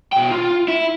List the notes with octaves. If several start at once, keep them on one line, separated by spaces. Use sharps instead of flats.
B2 G5
F4
E4